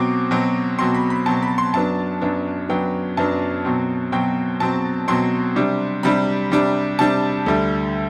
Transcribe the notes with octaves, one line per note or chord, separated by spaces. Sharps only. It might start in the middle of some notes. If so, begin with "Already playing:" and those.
Already playing: B2 F#3 C4 D6
B2 F#3 C4
B2 F#3 C4 C6
B5
B5
B2 F#3 C4 A5
B5
C6
F#2 F#3 B3 D4 A5
F#2 F#3 B3 D4
F#2 F#3 B3 D4 G5
F#2 F#3 B3 D4 A5
B2 F#3 C4
B2 F#3 C4 G5
B2 F#3 C4 A5
B2 F#3 C4 C6
C3 G3 D4
C3 G3 D4 B5
C3 G3 D4
C3 G3 D4 A5
D2 D3 G3